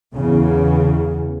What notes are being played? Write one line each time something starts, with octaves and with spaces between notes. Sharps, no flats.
E2 C#3